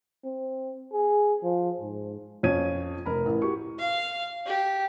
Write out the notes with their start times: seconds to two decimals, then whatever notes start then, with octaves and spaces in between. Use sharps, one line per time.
0.24 C4
0.93 G#4
1.43 F3
1.81 G#2
2.43 F2 C#4 C#5 G#6 D#7
3.06 F1 A#4 B5
3.25 A1
3.42 F#4 G4 C#6
3.79 F5
4.46 G4